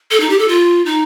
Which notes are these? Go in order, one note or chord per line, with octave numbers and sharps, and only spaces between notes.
A4
D#4
G4
A4
F4
D#4